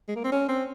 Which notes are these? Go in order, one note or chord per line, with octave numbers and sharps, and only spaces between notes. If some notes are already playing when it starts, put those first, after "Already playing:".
G#3
A#3
C4
C#4
C4